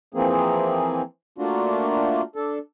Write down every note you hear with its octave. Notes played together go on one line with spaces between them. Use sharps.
E3 F3 A#3 C4 G#4
A3 A#3 D4 F4 F#4
D4 A4